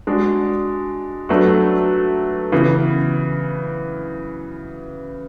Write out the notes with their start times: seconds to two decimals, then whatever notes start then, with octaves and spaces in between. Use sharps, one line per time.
0.07 G#3 D4 F#4
1.29 F#3 A3 D4 F#4 B4
2.52 C#3 E3 B3